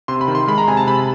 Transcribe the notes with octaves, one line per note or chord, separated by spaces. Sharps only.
C3 C6
B5
D#3
C6
G#3 B5
A#5
C3 G#5
A5
C3 B5